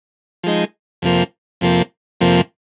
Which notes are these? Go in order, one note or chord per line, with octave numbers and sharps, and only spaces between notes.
F3 G#3 D#4
F2 C3 F3 A#3
F2 C3 F3 A#3
F2 C3 F3 A#3